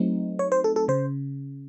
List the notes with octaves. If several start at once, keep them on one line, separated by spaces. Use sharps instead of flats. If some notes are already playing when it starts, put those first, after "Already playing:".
Already playing: F#3 A3 C4 D#4
C#5
C5
A4
A4
C#3 C5